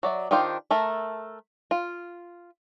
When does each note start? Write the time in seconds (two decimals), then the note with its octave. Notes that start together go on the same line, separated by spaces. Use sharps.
0.03 F#3 D5 E5
0.31 D#3 D4 F4 G4 C5
0.71 A3 A4 A#4 E5
1.71 F4